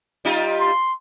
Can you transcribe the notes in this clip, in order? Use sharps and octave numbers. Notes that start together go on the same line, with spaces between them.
G3 D#4 F4
C6